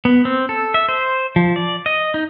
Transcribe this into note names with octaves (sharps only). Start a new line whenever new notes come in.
B3
C4
A4
E5
C5
F3
D5
D#5
D#4